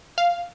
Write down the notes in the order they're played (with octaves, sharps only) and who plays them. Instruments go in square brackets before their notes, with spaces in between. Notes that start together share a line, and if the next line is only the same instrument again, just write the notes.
[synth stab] F5